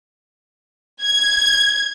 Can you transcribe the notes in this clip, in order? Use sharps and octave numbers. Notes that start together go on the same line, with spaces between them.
G#6